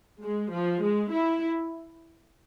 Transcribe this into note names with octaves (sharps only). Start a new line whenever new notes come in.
G#3
F3
G#3
E4